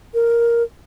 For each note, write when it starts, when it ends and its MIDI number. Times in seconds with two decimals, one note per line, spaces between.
0.14 0.63 70